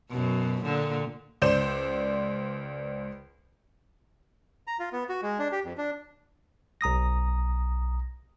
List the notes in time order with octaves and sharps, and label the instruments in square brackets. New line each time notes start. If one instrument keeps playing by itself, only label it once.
[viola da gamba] F#2 B2
A#2 D3
[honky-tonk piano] C#2 C5 D5 G6 E7
[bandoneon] A#5
F4
B3
F#4
G#3
D4
G4
F2
D4
[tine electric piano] B1 A#5 D#6 A#6